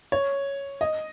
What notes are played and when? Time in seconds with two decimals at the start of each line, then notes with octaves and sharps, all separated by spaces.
0.12 C#5
0.81 D#5